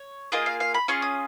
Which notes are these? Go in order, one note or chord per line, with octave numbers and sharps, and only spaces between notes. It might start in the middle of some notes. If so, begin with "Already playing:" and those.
Already playing: C#5
A#3 F4 G#4 D#5
F5
F5
B5
C#4 F4 G#4 C#6
D#6